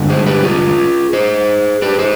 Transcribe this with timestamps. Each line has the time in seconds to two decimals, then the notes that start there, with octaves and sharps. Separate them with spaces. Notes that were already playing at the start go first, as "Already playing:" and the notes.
Already playing: G2 D3 G#3
0.10 G#4 C5
0.26 G4 B4
0.44 F4 G#4
1.13 G#4 C5
1.82 G4 B4
1.99 G#4 C5